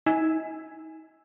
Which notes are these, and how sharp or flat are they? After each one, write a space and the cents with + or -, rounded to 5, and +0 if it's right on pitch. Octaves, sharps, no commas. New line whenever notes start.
D#4 +40 G#5 +0 E6 +0